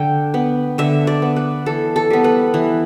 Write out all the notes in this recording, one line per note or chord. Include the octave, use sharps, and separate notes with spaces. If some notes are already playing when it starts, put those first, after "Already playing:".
Already playing: D3 G5
B3
D3 E5
D5
B3
B4
E3 A4
A4
G3 B3
B4
E3